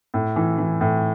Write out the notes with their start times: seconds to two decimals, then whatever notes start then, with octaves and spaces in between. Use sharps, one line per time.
0.14 A2
0.36 E3
0.58 E3
0.81 A2